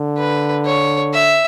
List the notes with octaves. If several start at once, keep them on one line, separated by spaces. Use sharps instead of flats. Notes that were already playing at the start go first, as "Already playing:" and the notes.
Already playing: D3
B4
C#5
E5